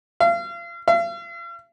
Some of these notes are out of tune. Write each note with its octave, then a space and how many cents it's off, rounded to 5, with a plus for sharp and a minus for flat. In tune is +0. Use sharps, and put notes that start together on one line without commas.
F5 -35
F5 -45